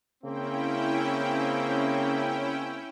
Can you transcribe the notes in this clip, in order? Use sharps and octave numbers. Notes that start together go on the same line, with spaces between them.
C#3 A#3 C4 C#4 E4 G5